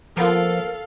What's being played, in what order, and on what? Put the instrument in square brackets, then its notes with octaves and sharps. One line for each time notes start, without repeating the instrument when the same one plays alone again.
[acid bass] F3 [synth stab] A#3 B3 F4 [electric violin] A4 F5 [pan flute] A#4